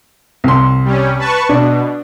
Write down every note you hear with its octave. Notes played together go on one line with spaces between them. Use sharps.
C2 C6
G3 C#4
B4 A5 C#6
B2 D4